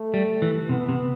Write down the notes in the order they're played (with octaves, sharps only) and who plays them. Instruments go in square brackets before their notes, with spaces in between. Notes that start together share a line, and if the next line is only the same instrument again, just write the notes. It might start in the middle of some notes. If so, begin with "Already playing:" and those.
Already playing: [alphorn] A3
[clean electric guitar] G3
E3
[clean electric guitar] C3 [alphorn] B3
[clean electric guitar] C3